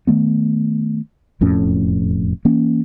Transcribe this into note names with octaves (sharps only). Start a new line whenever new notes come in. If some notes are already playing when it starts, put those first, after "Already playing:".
D#3 A3 B3
E1 F2 A2 C#4
E3 A#3 C#4